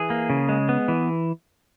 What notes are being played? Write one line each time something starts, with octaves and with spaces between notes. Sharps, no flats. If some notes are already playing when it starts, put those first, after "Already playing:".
Already playing: E3 G#4
A#3
C#3
G#3
B3
E3